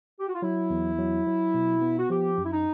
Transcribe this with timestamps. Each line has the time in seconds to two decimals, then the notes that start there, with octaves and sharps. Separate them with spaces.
0.19 G4
0.27 F#4
0.35 F4
0.42 F#3 E4
0.70 E2
0.98 F#3
1.26 F#3
1.54 B2
1.82 B3
1.98 F#4
2.10 F3 G4
2.38 F#2
2.45 E4
2.52 D#4